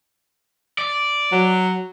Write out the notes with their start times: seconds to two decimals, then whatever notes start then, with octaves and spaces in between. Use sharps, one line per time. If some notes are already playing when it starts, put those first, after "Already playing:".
0.78 D5
1.32 F#3